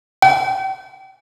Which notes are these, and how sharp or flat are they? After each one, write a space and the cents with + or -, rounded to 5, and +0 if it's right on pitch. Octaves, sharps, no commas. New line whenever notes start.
G5 -35